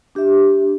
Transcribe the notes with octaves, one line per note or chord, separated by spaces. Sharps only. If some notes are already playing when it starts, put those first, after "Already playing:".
D4 G4 E5